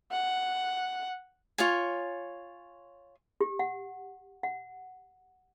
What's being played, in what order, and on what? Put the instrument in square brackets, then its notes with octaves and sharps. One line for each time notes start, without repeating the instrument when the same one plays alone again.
[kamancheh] F#5
[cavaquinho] F4 C#5 G#5
[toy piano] G4
F#5
F#5